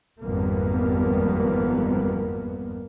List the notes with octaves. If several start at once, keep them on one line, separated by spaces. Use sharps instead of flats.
G#1 F2 G3 A#3 B3